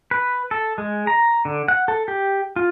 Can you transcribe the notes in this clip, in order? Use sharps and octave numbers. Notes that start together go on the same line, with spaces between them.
B4
A4
G#3
A#5
D3
F#5
A4
G4
F4